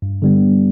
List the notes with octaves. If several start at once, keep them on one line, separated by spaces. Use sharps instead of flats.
G2
D3 G3 B3